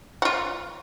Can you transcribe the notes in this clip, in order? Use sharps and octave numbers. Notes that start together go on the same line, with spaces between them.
F4 F#4